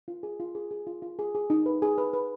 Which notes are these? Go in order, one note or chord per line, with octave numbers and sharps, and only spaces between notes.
F4
G#4
F4
G#4
G#4
F4
F4
G#4
G#4
D#4
B4
G#4
B4
B4